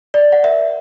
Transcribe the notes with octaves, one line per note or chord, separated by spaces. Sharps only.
D5
F#5
A#4 E5